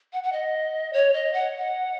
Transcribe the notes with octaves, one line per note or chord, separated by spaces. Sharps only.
F#5
F#5
D#5
C#5
D#5
F#5
F#5